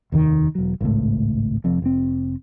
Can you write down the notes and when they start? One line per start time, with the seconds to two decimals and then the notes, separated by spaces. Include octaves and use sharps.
0.12 F1 D#2 D#3
0.55 E1 F#3
0.80 G#1 C#2 A2
1.64 F1 F2
1.82 F1 C4